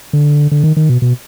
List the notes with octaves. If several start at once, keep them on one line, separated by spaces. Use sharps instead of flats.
D3
D3
D#3
D#3
B2
B2